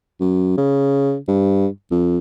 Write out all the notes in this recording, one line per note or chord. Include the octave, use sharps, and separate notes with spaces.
F#2
C#3
G2
F2